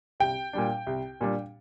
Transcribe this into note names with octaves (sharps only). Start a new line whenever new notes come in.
C2 G5
A#2 G3 D4
C2
A#2 G3 D4